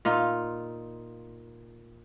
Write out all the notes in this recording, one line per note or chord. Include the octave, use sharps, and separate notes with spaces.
A#2 D#4 F4